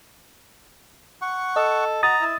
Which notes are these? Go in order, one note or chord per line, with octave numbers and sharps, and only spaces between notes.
F#5 C#6
A4 D#5
F#4 A#5 D#6 A6
E4